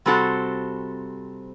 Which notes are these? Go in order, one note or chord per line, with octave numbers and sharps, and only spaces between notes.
C3 G3 C4 F#4 A4